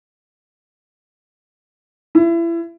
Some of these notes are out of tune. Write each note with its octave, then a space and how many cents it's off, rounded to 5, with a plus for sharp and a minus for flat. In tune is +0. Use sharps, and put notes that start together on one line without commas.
E4 +30